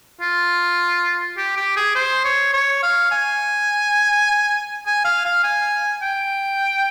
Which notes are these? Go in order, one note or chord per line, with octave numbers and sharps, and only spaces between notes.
F4
G4
G4
G#4
C5
C#5
C#5
F5
G#5
G#5
F5
F5
G#5
G5